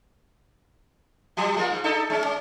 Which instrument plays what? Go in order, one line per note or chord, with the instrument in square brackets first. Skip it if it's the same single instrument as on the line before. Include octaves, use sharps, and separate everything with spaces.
[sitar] F3 G3
G#3 A#3 F4
G#2
D4 D#4 A4
G#3 C#4
C#4